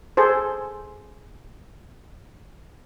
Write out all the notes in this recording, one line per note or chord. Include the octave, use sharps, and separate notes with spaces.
G#4 A4 C5